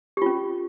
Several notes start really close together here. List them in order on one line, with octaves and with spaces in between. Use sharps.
G4 F4 C#4